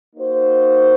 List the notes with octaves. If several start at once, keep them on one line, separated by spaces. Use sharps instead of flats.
A#3 D#4 F#4 C5